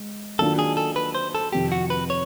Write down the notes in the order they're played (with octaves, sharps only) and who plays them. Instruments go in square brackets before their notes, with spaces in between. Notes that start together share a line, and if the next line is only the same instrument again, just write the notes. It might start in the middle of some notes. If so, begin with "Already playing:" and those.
Already playing: [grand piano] G#3
[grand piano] D#3 F#3 A#3 D4 F4 [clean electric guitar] A4
[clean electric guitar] G#4
A4
B4
C5
A4
[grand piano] F2 C3 D#3 [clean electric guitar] G4
[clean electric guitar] F#4
B4
C#5